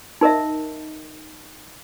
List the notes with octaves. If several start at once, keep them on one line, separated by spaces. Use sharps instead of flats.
D#4 A#4 D#5 E5